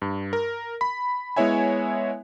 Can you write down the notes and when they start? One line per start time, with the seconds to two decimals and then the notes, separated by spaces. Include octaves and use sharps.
0.02 G2
0.33 A#4
0.81 B5
1.36 G#3 B3 E4 C#5 E5 G#5